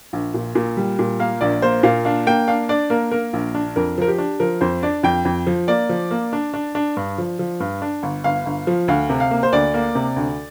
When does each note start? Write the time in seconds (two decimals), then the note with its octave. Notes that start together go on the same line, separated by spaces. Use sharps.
0.13 A#1
0.34 A#2
0.55 A#2
0.77 G3
0.99 A#2
1.20 A#3 F5
1.41 A#1 D5
1.62 A#3 C5
1.83 A#2 F5
2.05 D4 F5
2.27 A#3 G5
2.48 D4 F5
2.69 D4 D5
2.90 A#3 A#4
3.11 A#3 A#4
3.33 A#1
3.55 D4
3.76 F2 A#4
3.98 F3 A#4
4.08 G4
4.18 D4
4.40 F3 A#4
4.61 F2 C5
4.83 D4 D5
5.03 F2 G5
5.25 F2
5.47 F3
5.68 A#3 D5
5.89 F3
6.11 A#3
6.33 D4
6.54 D4
6.75 D4
6.97 G2
7.18 F3
7.39 F3
7.60 G2
7.82 D4
8.03 G1
8.24 G1 F5
8.46 G1
8.67 F3
8.88 D2 F5
9.10 C3
9.20 F5
9.31 A#3
9.43 C5
9.53 D2 D5
9.74 A#3
9.95 C3
10.16 D2